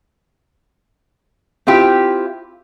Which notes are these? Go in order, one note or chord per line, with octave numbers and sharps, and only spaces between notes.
C4 E4 F4 G4